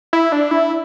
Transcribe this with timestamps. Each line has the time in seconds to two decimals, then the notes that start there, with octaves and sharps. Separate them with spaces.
0.13 E4
0.32 D4
0.51 E4